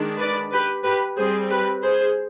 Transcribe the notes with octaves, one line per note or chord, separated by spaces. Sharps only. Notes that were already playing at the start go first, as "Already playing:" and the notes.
Already playing: D#3 G#3 D4
B4 D5
G4 B4
G4 B4
G3 C4 G#4 C5
G4 B4
G#4 C5